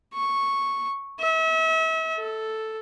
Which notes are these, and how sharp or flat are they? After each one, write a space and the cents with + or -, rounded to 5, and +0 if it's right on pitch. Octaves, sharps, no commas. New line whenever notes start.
C#6 -5
E5 -40
A4 +0